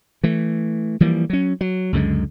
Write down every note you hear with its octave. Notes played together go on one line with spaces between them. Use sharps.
E3 A3
E3 F3 G3 A#3
F#3 C#4
F#3
C#2 F#2 D3 G#3